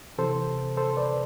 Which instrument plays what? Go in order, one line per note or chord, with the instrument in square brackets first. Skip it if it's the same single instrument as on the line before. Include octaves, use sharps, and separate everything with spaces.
[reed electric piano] C3 E3 A4 C5
A4 C5
B4 D5